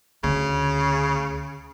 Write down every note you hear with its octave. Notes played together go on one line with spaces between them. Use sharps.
D2 C#3